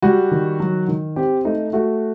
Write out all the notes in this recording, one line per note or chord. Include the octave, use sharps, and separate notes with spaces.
G3 F#4
D#3
F#3
D#3
C4 G4
A3 D#4
A3 F#4